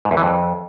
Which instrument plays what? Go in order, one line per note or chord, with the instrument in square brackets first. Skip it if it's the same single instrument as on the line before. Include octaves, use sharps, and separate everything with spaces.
[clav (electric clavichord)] G#2
E2
E3
F2